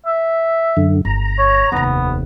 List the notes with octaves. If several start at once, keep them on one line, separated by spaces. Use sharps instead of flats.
E5
F#2 D3
G1 A#5
C#5
F1 D#2 B3